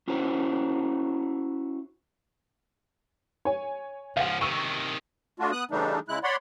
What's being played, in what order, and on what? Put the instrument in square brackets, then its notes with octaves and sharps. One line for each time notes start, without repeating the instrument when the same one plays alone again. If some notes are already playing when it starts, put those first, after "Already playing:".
[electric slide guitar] C#4 E4 F#4 C5 C#5
[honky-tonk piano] C#5 G#5
[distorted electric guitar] C#2 F3 [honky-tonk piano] F5 F#5
[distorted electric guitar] C3 D#3 [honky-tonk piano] C#6 E6
[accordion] A3 D4 F4 F#4
B3 D#6 F#6
C#3 E3 G3 A3 D4 D#4
C#3 G#3 E4 F#6
C#5 D5 F#5 B5 C6